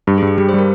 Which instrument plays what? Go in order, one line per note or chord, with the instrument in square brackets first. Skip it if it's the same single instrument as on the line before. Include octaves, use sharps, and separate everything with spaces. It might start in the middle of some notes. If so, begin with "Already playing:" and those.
[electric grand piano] G2 [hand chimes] G4
[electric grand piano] G2 [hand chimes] G#4
[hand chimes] G4
[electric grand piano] G3 [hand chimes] G4
[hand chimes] C5
[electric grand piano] G3 [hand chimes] A#4